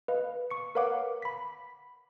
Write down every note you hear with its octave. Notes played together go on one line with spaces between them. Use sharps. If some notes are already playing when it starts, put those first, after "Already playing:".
B4 D#5 F5
C#6 C#7
A#4 B4 C#5 F5 F#5 D6
B5 B6